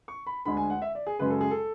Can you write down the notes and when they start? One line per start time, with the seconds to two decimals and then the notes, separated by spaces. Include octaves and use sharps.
0.08 C#6
0.27 B5
0.45 D2 D3 G#3 B5
0.57 G#5
0.70 F#5
0.82 E5
0.95 D5
1.07 G#4
1.19 F#2 C#3 G#3 B4
1.30 A4
1.41 G#4
1.51 A4